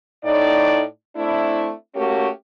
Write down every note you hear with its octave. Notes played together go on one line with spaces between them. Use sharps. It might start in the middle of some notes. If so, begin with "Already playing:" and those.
A2 D#4 D5
A3 C4 D4 E4
A3 A#3 C#4 F#4 G4